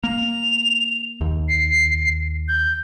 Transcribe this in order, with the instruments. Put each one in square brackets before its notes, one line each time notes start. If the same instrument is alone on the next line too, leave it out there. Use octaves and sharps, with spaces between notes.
[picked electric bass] A#3 [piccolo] F7
[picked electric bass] D#2
[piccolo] C7
G6